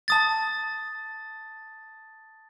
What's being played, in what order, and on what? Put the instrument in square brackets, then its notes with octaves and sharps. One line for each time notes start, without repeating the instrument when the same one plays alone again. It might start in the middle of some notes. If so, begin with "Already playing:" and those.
[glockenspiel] A5 D#6 A6